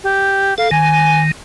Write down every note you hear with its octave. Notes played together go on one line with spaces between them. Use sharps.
G4
A4 F5
D#3 G#5